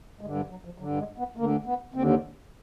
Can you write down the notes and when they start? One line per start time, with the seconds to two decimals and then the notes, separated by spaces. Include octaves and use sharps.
0.21 G2 D3 G#3
0.35 G3
0.50 F#3
0.65 F3
0.78 G2 D3 F#3
0.98 G#3
1.18 B3
1.36 D2 D3 A#3
1.66 B3
1.94 D#2 D3 C4